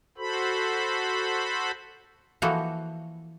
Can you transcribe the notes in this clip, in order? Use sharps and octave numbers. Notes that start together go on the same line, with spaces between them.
F#4 A4 C5 B5
E3 F3 A#3 F#4 A4